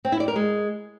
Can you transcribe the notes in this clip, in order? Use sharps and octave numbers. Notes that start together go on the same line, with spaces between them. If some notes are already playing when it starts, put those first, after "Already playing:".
C4
E4
D5
A#4
G#3